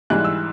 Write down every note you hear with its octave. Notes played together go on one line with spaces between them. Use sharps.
G#2 E3 G3 F#6
E6